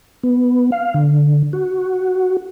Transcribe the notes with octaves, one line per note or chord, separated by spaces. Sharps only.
B3
F5
D3
F#4